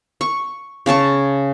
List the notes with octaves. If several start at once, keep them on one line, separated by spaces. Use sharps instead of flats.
C#6
C#3 C#5 A5 C#6